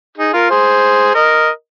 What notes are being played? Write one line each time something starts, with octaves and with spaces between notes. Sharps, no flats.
D#4 G#4
F4 A#4
G#4 C5
A#4 D#5